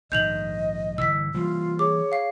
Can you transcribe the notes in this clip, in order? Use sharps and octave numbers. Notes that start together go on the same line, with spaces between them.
A#1 G#2 D#3 D#5 G6 F7 F#7
G1 C#2 E3 E6 B6
E3 G3 A#3 F4
G#4 C#5 D6
F5 C7